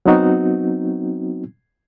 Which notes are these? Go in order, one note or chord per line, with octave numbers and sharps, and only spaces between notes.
F#3 B3 C4 D#4 F#4